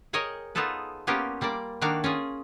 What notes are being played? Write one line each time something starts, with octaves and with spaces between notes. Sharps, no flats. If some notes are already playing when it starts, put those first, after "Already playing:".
G#4 A#4 C#5 D#5 G5 G#5
B3 D#4 F4 G#4 A4 B4
A#3 B3 C#4 F4 G4 A#4
G3 A#3 C5 D5
D#3 A#3 D4 F#4 F5
C#4 F4 G#4